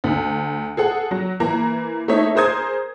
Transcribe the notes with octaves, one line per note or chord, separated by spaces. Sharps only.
D2
G#4 A4 F#5
F#3
E3 A#3 A#5
A3 D#4 E4 C#5 E5
G#4 A#4 C5 D#6 G#6